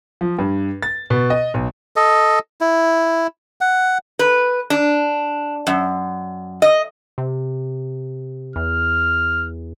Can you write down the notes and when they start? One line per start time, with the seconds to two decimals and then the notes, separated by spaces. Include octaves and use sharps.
0.21 F3
0.38 G2
0.83 A6
1.10 B2
1.30 D#5
1.54 B1
1.96 A4 D#5
2.61 E4
3.61 F#5
4.19 B4
4.70 D4
5.67 F#2
6.62 D#5
7.18 C3
8.56 E2 F6